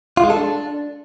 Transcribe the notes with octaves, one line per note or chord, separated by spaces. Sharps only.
F4
G#3
A4
D4